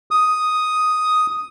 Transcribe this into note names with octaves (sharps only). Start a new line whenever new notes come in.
D#6